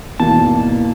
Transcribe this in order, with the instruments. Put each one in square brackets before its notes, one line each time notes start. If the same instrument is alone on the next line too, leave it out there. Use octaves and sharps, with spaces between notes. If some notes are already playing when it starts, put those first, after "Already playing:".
[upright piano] G#1 E2 B2 [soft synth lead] A#3 [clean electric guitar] A5